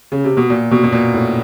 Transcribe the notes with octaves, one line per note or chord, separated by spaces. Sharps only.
C#3
C3
B2
A#2
B2
B2
A#2
A2